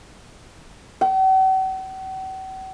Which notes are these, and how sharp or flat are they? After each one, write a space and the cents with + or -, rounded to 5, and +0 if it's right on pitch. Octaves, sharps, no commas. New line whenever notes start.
F#5 +45